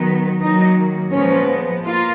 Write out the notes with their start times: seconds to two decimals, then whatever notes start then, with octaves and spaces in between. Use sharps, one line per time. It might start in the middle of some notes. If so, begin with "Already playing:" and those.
Already playing: D#3 F#3 B3
0.41 D#3 F#3 A#3 D#4
1.12 A#2 F3 G#3 B3 C#4
1.84 A#3 F4